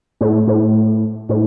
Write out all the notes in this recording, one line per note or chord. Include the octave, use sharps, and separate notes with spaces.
A2
A2
A2